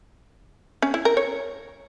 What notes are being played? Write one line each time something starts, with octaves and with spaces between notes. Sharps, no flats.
C#4
E4
A#4
C#5